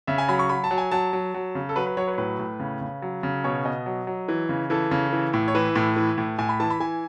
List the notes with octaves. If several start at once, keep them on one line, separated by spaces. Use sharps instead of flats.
C#3 E5
G#5
F#3 B5
C#6
F#3 B5
A5
F#3
G#5
F#3 A5
F#3
F#3
C#3
A4
F#3 B4
B4
F#3 C#5
B4
C#5
A2 B4
A2
C#3
C#3
F#3
C#3
B2 C#5
B2 D#5
F#3
F#3
E3
C#3
E3 A4
C#3
E3
A2
C#5
E3 B4
A2
E3
A2
A2 G#5
B5
E3 A5
B5
E3 G#5